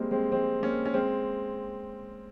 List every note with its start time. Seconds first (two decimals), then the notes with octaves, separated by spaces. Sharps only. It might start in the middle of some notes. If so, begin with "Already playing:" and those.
Already playing: G3 G#3 A#3 C4
0.11 G#3 C4
0.32 G#3 C4
0.62 A#3 C#4
0.86 C#4
0.94 G#3 C4